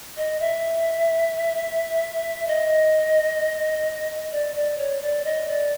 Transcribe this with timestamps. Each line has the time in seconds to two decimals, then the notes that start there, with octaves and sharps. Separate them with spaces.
0.17 D#5
0.40 E5
2.47 D#5
4.32 D5
4.56 D5
4.78 C#5
5.02 D5
5.25 D#5
5.48 D5